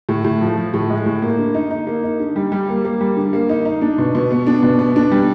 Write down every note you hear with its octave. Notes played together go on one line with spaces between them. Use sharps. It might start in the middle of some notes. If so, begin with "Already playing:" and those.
A2
A2
F3
F3
A2
G#3
A2
A#3
D3
D#4
D#4
A#3
D#4
D3
G3
G3
A#3
A#3
G3
D3
A#3
D#4
D#4
D4
B2
B2
B3
D4
B2
B3
D4
G3